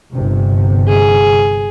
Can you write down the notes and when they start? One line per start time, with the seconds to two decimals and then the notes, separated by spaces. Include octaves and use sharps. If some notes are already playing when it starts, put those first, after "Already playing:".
0.12 G1 C3
0.88 G#4